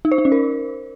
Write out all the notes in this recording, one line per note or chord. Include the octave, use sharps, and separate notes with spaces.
D#4
C5
D#4
C#4
A#4